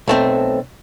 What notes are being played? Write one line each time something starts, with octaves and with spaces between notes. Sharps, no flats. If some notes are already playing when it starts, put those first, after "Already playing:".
B1 A3 C4